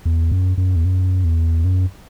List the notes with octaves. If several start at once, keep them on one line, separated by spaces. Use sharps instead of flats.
E2
F#2
F#2
E2
F#2
E2
F#2